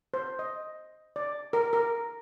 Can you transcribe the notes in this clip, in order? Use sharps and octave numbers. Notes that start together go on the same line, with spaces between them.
C5
D#5
D5
A#4
A#4